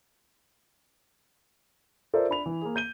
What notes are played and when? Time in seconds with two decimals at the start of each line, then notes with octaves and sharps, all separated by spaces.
2.13 F4 A4 A#4 C5 D5 E5
2.29 D4 B5 F7
2.46 E3
2.61 A#3 G#4
2.76 G6 D#7 G7